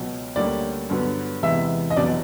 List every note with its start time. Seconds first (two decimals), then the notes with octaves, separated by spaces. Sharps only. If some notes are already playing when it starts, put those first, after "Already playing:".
Already playing: C#2 B2 F#3
0.36 D2 D3 G3 A#3 C#4 D5
0.90 G2 D3 F#3 B3
1.43 E2 C3 E3 G#3 B3 E5
1.90 D#5
1.97 F1 E2 B2 F#3 D5